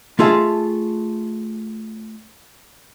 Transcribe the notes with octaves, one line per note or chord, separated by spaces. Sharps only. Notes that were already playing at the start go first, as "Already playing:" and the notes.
A3 F4 G#4 D#5 E5